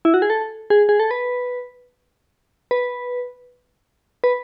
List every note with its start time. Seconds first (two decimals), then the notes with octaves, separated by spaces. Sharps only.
0.05 E4
0.14 F#4
0.22 G#4
0.30 A4
0.70 G#4
0.89 G#4
1.00 A4
1.11 B4
2.71 B4
4.24 B4